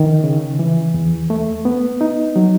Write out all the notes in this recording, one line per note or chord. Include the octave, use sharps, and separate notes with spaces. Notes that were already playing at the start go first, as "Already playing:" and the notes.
Already playing: D#3
C#3
E3
E2
A3
B3
D#4
F#3